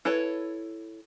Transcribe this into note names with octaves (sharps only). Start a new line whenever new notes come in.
E4 A4 B4 C#5